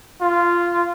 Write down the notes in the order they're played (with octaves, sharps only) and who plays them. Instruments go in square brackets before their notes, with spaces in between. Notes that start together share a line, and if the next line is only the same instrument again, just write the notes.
[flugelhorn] F4